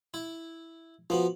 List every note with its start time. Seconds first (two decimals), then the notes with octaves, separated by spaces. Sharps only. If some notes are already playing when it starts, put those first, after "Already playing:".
0.14 E4
1.10 F3 B3 F4 F#4